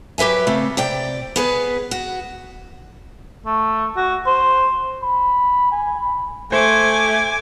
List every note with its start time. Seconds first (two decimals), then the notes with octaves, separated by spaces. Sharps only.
0.18 F#3 G4 B4 E5 G#5
0.47 C#3 A3 C4
0.77 C3 D5 G5
1.36 B3 G#4 B4
1.91 F#4
3.46 A3
3.97 F#4
4.26 C5
5.03 B5
5.72 G#5
6.01 B5
6.52 A3 C5 G#5 D6